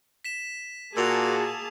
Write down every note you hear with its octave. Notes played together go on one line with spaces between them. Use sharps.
B6 E7
A#2 A#3 F#4 G#4 A5 E6 F7